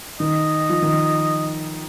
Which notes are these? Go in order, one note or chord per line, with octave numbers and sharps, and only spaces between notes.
D#3 D#5
F3
D#3